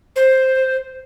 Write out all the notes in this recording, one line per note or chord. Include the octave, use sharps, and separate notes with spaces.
C5